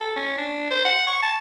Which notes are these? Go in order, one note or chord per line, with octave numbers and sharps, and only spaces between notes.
A4
C#4
D4
C5
F#5
C#6
A5